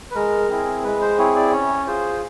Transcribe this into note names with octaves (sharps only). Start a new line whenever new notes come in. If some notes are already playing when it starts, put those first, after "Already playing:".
B4
G#3 A#4
C4 E4 G#4
G#3 B4
C5
C4 E4 G#4 C#5
D5
C#4 C#5
F4 G#4 C5